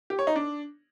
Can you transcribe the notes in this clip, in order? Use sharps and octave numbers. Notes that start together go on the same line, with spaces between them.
G4
C#5
D#4
D4